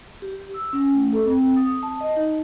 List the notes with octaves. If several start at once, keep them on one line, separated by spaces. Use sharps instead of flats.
G4
E6
C#4
A3
A4
C4
D#6
A5
D#5
D#4